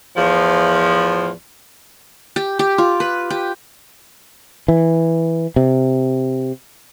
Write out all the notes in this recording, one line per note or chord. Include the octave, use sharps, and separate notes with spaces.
E2 A2 F3
G4
G4
F4
B4
G4
E3
C3